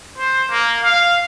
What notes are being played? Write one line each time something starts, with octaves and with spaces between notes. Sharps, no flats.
C5
A#3
F5